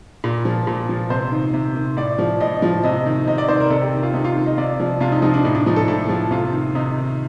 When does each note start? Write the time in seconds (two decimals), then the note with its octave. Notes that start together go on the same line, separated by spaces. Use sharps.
0.24 A#2
0.45 F3
0.67 A#2
0.89 F3
1.10 C3 C5
1.32 D#3
1.54 C3
1.75 D#3
1.97 A2 D5
2.19 F3
2.40 A2 D#5
2.62 F3
2.84 C3 D#5
3.06 D#3
3.27 C3 D#5
3.38 D5
3.48 D#3 C5
3.60 A#4
3.70 C3 A4
3.82 G4
3.93 D#3
4.03 F4
4.14 C3 D#4
4.24 F4
4.36 D#3
4.46 D#5
4.58 C3 D5
4.80 F3
5.00 C3 F4
5.12 D#4
5.22 F3 D#4
5.34 D4
5.45 A2 D#4
5.55 D4
5.66 F3 D#4
5.76 A4
5.88 A2 A4
6.09 F3
6.31 C3 F4
6.52 D#3
6.75 C3 D#4
6.97 D#3